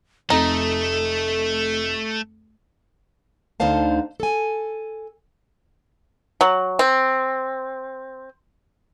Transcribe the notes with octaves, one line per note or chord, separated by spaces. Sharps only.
F1 F2 A3 D#4 A4
D2 D3 D#4 C5 F5 A5
A4 G#5
F#3
C4